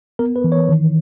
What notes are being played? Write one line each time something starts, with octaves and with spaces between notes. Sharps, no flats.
B3 A#4
B4
E3
C#5
D#3